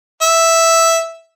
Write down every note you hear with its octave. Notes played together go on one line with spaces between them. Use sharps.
E5